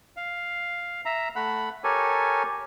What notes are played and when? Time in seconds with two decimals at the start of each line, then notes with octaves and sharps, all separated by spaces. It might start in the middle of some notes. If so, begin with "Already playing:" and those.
0.17 F5
1.05 E5 A#5
1.36 A3 F#5 B5
1.84 G4 A4 A#4 C#5 G#5